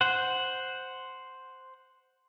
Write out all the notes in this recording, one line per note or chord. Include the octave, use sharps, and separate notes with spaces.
C5 F#5